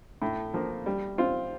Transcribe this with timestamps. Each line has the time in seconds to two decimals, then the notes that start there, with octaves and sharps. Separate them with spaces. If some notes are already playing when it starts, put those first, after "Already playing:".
0.22 A2
0.54 F3 A#3
0.86 G3
1.18 C4 F4